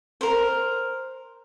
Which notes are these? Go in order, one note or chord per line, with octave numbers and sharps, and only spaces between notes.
A#4 C5